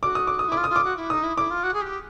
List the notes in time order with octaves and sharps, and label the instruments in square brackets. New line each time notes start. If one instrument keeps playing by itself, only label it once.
[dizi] F#4 [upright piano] D6
[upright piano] D#6
D6
D#6
[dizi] E4
[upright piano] D6
[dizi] F4
[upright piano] D#6
[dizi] F4
[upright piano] D6
[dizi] F#4
E4
[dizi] D#4 [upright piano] D#6
[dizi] E4
[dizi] E4 [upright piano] D6
[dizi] F4
F#4
G#4
G4